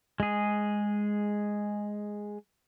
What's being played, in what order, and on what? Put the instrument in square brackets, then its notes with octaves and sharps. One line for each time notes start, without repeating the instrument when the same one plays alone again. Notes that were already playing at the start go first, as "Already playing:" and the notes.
[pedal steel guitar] G#3 G#4